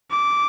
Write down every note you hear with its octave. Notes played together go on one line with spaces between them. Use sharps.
D6